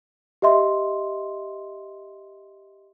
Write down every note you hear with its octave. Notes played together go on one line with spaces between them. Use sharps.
G4 D#5 E5 C6